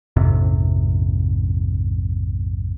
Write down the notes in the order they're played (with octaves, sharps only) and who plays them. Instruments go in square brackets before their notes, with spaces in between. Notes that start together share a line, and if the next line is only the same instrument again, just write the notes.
[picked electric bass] A#1 F2 G#2 C3